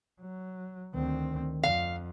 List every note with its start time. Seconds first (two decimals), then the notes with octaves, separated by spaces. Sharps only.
0.21 F#3
0.94 D2 D#3 C4
1.63 F2 F5